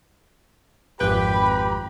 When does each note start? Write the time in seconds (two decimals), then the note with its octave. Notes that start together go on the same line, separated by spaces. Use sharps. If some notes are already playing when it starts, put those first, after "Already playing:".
1.00 G#1 F2 G4 B4 G5 B5